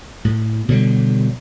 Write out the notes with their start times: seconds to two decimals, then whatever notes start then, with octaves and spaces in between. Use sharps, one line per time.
0.25 A2
0.68 B2 D3 F#3 G3